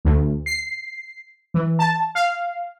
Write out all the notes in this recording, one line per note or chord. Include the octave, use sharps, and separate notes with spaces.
D2
C7
E3
A5
F5